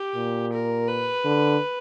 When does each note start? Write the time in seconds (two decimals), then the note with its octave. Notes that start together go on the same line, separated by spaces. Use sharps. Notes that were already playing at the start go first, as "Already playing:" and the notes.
Already playing: G4
0.16 A#2
0.52 A#4
0.88 B4
1.25 D3